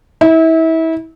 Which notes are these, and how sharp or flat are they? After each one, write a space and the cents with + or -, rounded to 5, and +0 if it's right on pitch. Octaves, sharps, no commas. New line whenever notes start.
E4 -30